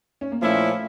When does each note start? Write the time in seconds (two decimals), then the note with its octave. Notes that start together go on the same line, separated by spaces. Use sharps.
0.21 C#4
0.32 A#3
0.42 A#2 F3 A3 C#4 E4